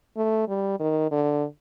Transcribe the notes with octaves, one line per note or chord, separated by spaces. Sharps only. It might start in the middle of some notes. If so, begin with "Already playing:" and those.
A3
G3
D#3
D3